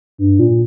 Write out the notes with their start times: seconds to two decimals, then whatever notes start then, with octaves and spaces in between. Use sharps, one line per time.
0.18 G2
0.39 A#2